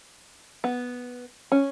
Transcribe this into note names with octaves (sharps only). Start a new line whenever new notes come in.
B3
C#4